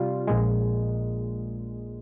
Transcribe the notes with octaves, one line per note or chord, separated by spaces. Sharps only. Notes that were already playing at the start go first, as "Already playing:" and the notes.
Already playing: C3 G3 F4
A#1 A#2 G#3